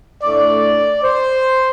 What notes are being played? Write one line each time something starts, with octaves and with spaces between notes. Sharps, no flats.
A2 A3 D4 D5
C5